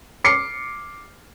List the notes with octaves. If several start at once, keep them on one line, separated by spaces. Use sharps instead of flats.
D6 C7 C#7